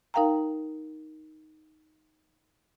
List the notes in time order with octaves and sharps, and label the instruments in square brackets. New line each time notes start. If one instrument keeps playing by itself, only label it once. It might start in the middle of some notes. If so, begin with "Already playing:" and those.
[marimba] D#4 A#4 F5 G5 A#5